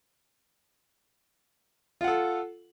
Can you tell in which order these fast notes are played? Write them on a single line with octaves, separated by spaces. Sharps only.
F4 F#5 A4